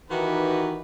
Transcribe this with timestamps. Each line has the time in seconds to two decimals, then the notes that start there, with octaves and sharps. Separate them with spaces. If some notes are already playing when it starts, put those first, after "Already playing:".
0.11 D#3 E3 D#4 F#4 G4 B4